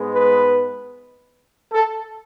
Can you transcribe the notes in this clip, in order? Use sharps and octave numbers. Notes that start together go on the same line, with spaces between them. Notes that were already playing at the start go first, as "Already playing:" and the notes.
Already playing: G#2 G#3 B3
B4
A4